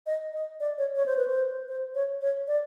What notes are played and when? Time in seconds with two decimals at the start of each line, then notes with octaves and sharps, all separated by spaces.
0.07 D#5
0.33 D#5
0.60 D5
0.78 C#5
0.96 C#5
1.06 C5
1.17 B4
1.28 C5
1.68 C5
1.95 C#5
2.21 C#5
2.48 D5